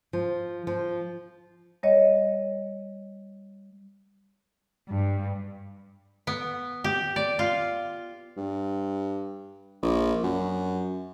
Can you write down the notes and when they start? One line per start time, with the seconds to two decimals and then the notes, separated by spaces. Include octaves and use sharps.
0.13 F3
0.67 F3
1.83 G3 C#5 D#5
4.89 G2
6.27 B3
6.84 G4
7.16 D5
7.39 F4
8.37 G2
9.82 A#1
10.23 F#2